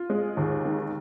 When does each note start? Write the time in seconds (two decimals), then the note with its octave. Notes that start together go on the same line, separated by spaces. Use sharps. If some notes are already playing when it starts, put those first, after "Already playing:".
Already playing: F4
0.10 G#3
0.37 D#2
0.65 D#3